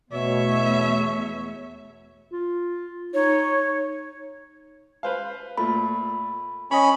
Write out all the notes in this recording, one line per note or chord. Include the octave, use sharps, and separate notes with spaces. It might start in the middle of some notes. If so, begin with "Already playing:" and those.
E2 B2 A3 C#5 E5
F4
D#4 C#5
B4 C5 F5
A#2 A3 B5
C#4 C#5 D#5 B5